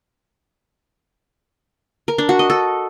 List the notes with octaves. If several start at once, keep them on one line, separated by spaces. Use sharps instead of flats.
A#4
D4
F#4
D#5
A4